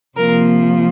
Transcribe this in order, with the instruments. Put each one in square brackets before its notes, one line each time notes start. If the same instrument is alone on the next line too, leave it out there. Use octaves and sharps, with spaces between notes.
[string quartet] C3 F3 A#3 A#4